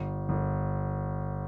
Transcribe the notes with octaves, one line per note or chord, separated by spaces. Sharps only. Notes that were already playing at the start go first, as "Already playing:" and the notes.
Already playing: G1
G1